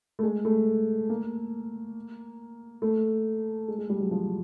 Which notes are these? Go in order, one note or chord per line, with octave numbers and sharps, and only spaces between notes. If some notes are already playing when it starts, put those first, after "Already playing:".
A3
G#3
A3
A#3
A3
G#3
G#3
G3
F#3
F3